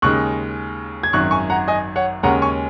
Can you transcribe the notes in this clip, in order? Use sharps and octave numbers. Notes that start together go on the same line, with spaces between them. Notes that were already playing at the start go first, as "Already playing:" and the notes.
D#2 C#3 G#3 D#4 C#6 F#6
G#6
G#1 F#2 D#3 C#6 F#6
G#5 C#6
F#5 A#5
D#5 G#5
C#5 F#5
D#2 C#3 G#3 C#4 F#5 A#5
G#5 C#6